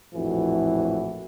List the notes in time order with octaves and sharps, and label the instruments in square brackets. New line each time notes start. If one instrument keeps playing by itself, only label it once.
[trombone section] A#1 F2 A2 E3 F#4